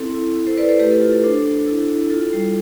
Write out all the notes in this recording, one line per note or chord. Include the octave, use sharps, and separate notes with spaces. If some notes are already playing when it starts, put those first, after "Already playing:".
Already playing: C4 E4 A4
E4
E4
A4 C5
E4 B4 D5
A4 C5
A3 G4 B4
A4
F4 A4
A4
D4 A4 C5
D4
E4 A4
E4
F4 A4
G3